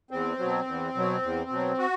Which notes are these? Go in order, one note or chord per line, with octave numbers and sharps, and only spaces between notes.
E2 C4
B2 F#3
E2
B2 F#3
E2
B2 F#3
F#4